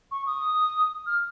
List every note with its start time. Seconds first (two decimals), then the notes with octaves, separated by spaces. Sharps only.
0.11 C#6
0.27 D#6
1.06 F6